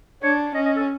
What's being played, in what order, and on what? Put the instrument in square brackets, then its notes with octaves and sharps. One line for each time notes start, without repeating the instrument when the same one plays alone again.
[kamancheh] D4 [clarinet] C#5
[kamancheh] C#4 [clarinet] D#5
[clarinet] D#5
A4